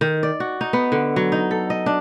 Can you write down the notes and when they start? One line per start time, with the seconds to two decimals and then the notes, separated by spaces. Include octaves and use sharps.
0.01 D#3
0.23 D5
0.40 F#4
0.61 D#4
0.73 B3
0.92 D3
1.16 F#3
1.32 D#4
1.51 A4
1.70 D#5
1.86 D4